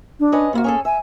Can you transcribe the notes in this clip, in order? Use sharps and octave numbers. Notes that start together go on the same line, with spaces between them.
D4
C#4 B4 D#5
C3 A#3 E4 F#4
C#4 G#4 A4
E5 G#5